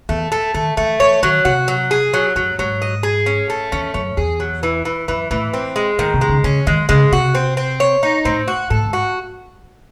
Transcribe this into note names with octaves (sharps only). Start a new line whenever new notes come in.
E2 A3
A3
D#3 A3
E3 A3
E3 C#5
D#3 F#3
C3 F#4
F#3
G#4
F#3
F#2 F#3
G#2 F#3
D#5
G#4
C#4
A3
E2 C#4
F#2 C#4
E2 G#4
F#3
E3
E3
F#2 E3
A2 E3
C4
G#3
A2 D#3
C3
G#3
C#3
C#3 C#4
D#3 G#3
C#3 G#3
C3 F#4
C4
C4
C#5
D#4
A2 C4
F#4
A2 A4
G#2
F#4